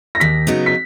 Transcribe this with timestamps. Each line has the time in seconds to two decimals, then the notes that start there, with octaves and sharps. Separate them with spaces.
0.15 A#6
0.20 D#2 B6
0.47 C#3 F#3 B3 D#4
0.66 B6